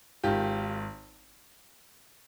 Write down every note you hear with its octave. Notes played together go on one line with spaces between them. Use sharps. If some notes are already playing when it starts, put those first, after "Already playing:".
G#1 G#2 D#3 F4 G4